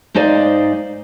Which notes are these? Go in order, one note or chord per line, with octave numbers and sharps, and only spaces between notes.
G#2 G#3 D#4 C5 D5 F5